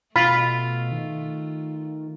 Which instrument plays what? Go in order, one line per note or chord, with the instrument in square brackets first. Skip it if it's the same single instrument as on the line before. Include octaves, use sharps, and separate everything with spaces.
[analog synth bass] B2 [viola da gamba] A3 [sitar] F4 [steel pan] B5
[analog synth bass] D#3